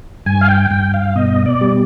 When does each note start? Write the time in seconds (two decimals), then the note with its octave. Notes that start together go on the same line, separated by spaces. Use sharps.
0.26 G2 G#5
0.41 F5
0.49 G5
0.71 G2 G5
0.94 F5
1.15 B2 D#5
1.46 D5
1.61 G3